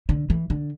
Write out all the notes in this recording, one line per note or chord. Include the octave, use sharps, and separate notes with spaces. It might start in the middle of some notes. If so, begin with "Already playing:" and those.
D3
E3
D3